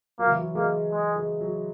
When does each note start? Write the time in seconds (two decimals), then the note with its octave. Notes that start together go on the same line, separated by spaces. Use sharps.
0.19 F#3 A#3
0.27 E3
0.36 F#3
0.55 G#3 A#3
0.92 G#3
1.16 G#3
1.41 F#3